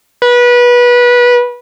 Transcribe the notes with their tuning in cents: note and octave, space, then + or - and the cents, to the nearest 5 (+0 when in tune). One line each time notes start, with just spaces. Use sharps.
B4 -25